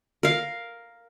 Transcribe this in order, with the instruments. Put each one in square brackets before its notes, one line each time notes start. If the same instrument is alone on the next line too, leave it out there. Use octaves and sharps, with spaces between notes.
[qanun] A#4 F5